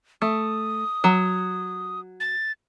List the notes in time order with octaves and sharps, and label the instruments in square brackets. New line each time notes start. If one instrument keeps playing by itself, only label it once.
[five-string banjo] A3 [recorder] D#6
[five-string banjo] F#3
[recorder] A6